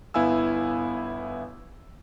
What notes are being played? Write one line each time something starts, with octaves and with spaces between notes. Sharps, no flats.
G1 B3 E4 F5 G#5 E6